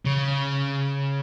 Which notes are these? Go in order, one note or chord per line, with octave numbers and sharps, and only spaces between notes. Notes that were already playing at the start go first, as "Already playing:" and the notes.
C#3